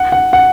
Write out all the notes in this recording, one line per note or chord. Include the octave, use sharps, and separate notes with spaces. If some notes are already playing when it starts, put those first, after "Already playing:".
Already playing: F#5
F#5
F#5